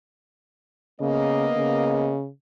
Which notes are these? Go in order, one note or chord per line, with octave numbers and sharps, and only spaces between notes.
C#3 A#3 B3 D#5
C#3